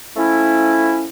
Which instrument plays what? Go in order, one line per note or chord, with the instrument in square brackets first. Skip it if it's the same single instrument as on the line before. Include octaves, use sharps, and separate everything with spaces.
[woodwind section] F3 A3 C#4 E4